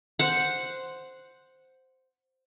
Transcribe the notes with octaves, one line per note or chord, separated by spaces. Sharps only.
C5 F#5